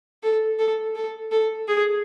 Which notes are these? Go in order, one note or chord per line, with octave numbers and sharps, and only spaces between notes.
A4
A4
A4
A4
G#4